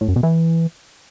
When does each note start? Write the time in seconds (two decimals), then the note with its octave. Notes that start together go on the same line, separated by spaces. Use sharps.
0.01 A2
0.08 F#2
0.16 B2
0.23 E3